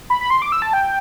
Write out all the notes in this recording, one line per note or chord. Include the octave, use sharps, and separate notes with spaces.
B5
B5
C6
D6
E6
A5
G5